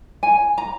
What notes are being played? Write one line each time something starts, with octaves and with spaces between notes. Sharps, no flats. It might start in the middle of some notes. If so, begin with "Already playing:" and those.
G#5
A#5